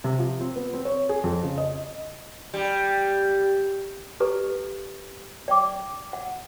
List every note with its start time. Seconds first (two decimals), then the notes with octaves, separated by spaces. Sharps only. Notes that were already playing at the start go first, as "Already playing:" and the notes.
0.04 C3
0.18 F3
0.41 C4
0.56 B3
0.73 C4
0.85 C#5
1.09 G#4
1.24 F2
1.44 C#3
1.58 D#5
2.54 G3
4.20 G4 A4 B4 D5 A#5 C#6
5.48 D5 G5 D6
6.13 F#5